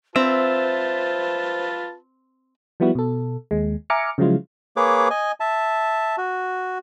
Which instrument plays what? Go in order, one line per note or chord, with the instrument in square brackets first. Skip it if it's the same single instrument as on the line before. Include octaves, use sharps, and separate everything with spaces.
[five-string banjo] C4 [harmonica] F4 B4 A5 [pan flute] C5 [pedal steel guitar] E5
[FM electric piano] F3 G3 B3 E4 F#4
B2 A4
D#2 G#3
E5 G#5 A#5 D6 F6 C#7
C#3 F3 F#3 G#3 E4 F4
[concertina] A#3 G#4 B4 C#5 D6
D#5 G#5
E5 A5
F#4